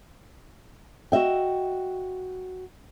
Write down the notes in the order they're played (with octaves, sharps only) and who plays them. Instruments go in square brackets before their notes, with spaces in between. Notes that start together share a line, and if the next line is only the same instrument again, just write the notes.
[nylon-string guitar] F#4 D#5 E5 G5